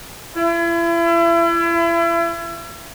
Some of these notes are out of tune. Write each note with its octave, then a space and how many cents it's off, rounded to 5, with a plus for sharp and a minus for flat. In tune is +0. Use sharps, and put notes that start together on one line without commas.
E4 +35